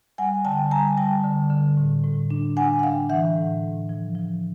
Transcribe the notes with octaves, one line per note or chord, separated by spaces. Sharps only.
G3 F#5 G#5
D3 G5 A5
G3 G#5 A#5
G3 G5 A5
D3
D3
A2
A2
D4
D4 F#5 G#5
F#5
D4 F5 G5
E3 E5 F#5
A2
A2
F3
F3